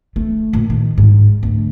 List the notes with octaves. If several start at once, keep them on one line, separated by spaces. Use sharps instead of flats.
A3
A#2
D#3
G#2
D2